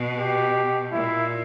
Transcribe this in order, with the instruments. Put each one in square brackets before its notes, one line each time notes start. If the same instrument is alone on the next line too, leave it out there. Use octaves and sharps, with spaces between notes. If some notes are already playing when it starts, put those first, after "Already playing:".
Already playing: [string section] B2
[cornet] G4
[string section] A#2 [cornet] E4